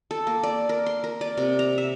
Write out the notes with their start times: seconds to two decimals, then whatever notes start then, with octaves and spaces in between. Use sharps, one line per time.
0.11 A4
0.27 A#3
0.43 D5
0.69 A#4
0.86 C6
1.04 A#4
1.21 D5
1.37 C3
1.59 A#5
1.78 E5